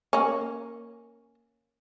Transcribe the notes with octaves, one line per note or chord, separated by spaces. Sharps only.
A#3 C#4